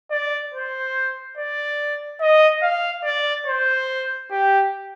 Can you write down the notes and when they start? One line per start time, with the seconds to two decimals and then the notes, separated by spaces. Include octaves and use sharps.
0.11 D5
0.54 C5
1.37 D5
2.21 D#5
2.62 F5
3.05 D5
3.47 C5
4.31 G4